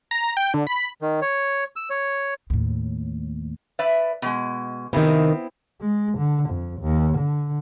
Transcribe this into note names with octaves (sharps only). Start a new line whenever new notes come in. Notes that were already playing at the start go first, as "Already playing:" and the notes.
A#5
G5
D3
B5
D#3
C#5
E6
C#5
D#2 A2
B4 D5 E5
B2 G#3
C3 D#3 B3 C4 E4
G#3
D3
F2
D#2
D3